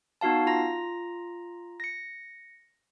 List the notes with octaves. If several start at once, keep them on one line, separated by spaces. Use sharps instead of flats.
B3 D#4 F#4 F5 A5
F4 A#5 A#6
A#6 C#7